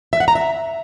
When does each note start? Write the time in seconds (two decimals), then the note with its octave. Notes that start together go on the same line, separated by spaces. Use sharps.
0.13 E5
0.20 F#5
0.28 A#5
0.35 E5